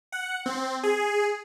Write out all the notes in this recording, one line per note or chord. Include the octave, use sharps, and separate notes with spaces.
F#5
C4
G#4